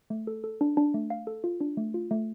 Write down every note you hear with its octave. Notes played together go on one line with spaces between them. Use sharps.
A3
A4
A4
D4
D4
A3
F5
A4
F4
D4
A3
F4
A3